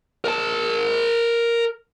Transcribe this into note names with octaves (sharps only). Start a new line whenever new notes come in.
A#4 A5